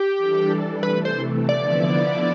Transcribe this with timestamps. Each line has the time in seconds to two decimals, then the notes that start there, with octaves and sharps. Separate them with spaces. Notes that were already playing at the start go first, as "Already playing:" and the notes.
Already playing: G4
0.18 E3 G3 D4 A4 D5
0.83 C3 E3 A3 B4
1.05 C5
1.48 D3 F3 B3 E4 D5